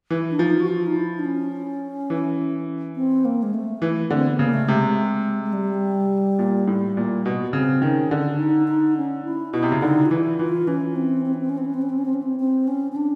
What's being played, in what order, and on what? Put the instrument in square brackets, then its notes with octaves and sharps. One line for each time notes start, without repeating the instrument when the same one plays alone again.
[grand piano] E3
[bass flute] D4
[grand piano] F3 [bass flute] D#4
[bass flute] F#4
F4
D#4
E4
D4
C#4
[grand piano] E3
[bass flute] C4
A#3
G#3
A3
[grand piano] E3
[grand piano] D3 [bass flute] C4
[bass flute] B3
[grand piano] C#3 [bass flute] A#3
[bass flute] A3
[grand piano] C3 [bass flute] G#3
[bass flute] G#3
G3
[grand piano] A#2
A2
A#2
B2
[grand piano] C#3 [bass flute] C4
[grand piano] D#3 [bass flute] C#4
[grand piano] D3 [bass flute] D4
[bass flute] D#4
D#4
C#4
E4
[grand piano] B2 [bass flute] E4
[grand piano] C3
C#3
[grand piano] D3 [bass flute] D#4
[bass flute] F4
[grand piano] E3 [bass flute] E4
[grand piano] E3 [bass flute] F4
[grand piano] E3 [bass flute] C#4
[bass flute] C4
C4
C#4
C4
C#4
C4
C#4
C4
C#4
C4
C#4
C4
C#4
C4
C4
C#4
C#4
D4